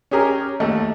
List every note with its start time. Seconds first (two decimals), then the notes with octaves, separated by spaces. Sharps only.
0.11 C#4 G4 G#4 A#4
0.60 D#2 A3